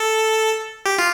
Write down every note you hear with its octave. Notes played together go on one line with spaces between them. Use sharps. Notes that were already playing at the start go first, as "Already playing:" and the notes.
Already playing: A4
G4
F4